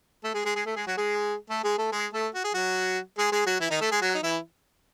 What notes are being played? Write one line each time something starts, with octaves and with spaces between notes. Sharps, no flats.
A3 A4
G#3 G#4
G#3 G#4
G#3 G#4
A3 A4
G#3 G#4
F#3 F#4
G#3 G#4
A3 A4
G#3 G#4
A3 A4
G#3 G#4
A3 A4
F#4
G#4
F#3 F#4
G#3 G#4
G#3 G#4
F#3 F#4
E3 E4
D#3 D#4
A3 A4
G#3 G#4
F#3 F#4
D#4
E3 E4